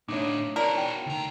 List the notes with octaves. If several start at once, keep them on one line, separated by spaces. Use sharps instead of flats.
A2 D4 D#4 C#5 E5 D6
E4 F#4 A#4 D5 F5 A5
G5
D2 A#5